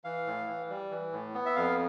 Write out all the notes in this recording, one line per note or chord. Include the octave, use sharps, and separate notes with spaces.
E3 F5
A2
E3
G3
E3
A2
B3
E5
F2 F5